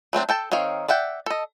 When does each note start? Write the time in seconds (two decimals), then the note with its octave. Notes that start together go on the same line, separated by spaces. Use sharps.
0.13 F#3 A3 C4 D4
0.29 A4 G5 A5
0.52 D#3 C4 C#5 F5
0.88 D5 E5 F#5 G5
1.26 A4 D#5